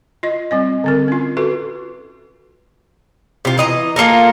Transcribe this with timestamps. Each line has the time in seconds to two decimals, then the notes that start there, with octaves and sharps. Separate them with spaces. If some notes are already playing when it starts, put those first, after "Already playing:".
0.23 F4 D#5
0.51 G3 C4 D#5
0.84 D3 C4 A#4
1.08 C#4 F4
1.37 F4 F#4 A4 B4
3.45 C3 F4
3.58 E3 D#5 A#5
3.96 A#3 F4 A4 A#4